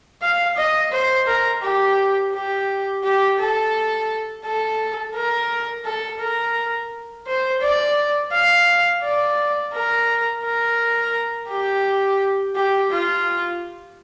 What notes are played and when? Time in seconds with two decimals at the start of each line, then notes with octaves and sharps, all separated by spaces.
0.22 F5
0.56 D#5
0.92 C5
1.26 A#4
1.62 G4
2.33 G4
3.04 G4
3.39 A4
4.45 A4
5.15 A#4
5.85 A4
6.20 A#4
7.27 C5
7.61 D5
8.32 F5
9.03 D5
9.73 A#4
10.44 A#4
11.49 G4
12.55 G4
12.91 F4